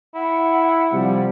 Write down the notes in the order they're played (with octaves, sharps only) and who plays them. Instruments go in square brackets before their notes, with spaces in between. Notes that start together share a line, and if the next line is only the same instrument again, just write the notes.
[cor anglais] E4 [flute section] F#5
[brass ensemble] C3 F3 G3